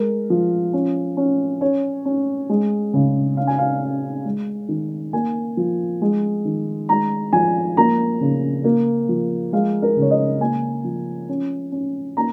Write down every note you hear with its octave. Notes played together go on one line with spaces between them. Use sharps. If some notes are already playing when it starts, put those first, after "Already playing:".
Already playing: G#3 A#4
F3
C#4
C#4
C#4 C#5
C#4
G#3
C#3
C#4 F5
G#5
F5
C#4
G#3
D#3
A#3 G#5
F3
G#3
D#3
G#3 A#5
F3 G#5
A#3 A#5
C#3
A#3
F3
G#3 F5
A#4
C#3
C#5
D#5
A#3 G#5
F3
C#4
C#4
A#3 A#5